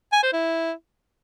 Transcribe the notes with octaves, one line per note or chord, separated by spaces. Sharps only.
G#5
C5
E4